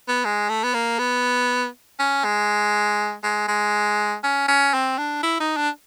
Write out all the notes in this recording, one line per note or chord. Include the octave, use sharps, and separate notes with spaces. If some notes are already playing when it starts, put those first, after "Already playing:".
B3
G#3
A3
B3
A#3
B3
C#4
G#3
G#3
G#3
C#4
C#4
C4
D4
E4
D#4
D4